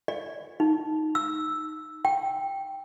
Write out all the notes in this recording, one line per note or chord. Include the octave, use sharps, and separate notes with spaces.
D5
D#4
E6
G5